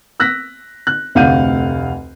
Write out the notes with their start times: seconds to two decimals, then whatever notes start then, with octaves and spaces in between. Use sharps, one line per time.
0.20 E6 F#6 A#6 B6
0.87 F#6
1.15 F1 D2 F5 F#5 G6 D#7